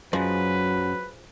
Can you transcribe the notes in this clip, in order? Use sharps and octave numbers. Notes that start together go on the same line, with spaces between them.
F#2 F3 F#3 G#3 B4